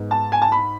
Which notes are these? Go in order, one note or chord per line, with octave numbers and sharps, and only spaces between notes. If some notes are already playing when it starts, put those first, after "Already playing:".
Already playing: G#2 G#3 B3
A5
G#5
A5
B5